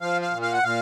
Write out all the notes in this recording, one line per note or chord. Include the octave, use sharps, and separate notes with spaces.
F3 F5
F5
A#2
F5
F#5
A#2 F5